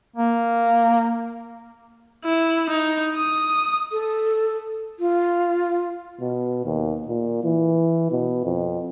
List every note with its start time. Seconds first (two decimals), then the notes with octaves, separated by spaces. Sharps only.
0.16 A#3
2.24 E4
2.70 D#4
3.16 D#6
3.92 A4
4.99 F4
6.21 B2
6.65 D#2
7.08 A#2
7.44 E3
8.12 B2
8.44 F2